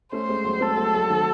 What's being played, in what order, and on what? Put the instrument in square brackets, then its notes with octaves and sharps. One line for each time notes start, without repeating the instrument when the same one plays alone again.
[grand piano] A3 C#4 [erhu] C5
[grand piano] G#3 C4
F#3 A3
[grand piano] G#3 C4 [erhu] A4
[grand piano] F#3 A3
F#3 A3
D#3 F#3